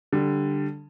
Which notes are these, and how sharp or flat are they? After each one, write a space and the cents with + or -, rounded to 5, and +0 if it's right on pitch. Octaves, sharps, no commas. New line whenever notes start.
D3 +0 G3 +0